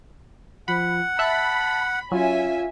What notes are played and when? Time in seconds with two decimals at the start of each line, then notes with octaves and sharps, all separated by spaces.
0.68 F3 F#5 B5
1.19 E5 A5 B5 F#6
2.12 F#3 C#4 F4 E5 G#5